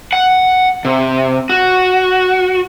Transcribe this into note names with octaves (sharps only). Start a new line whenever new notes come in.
F#5
C3
F#4